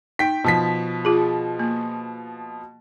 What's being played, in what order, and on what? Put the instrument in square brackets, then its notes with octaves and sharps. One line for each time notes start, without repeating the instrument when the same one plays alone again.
[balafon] D#4 [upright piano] G5 B6
[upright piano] B2 F3 B6
[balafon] F4 G#4
A#3